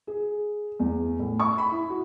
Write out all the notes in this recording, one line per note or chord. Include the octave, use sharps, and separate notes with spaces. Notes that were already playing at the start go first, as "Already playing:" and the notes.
G#4
E2
A2
C#6
B5
E4
F#4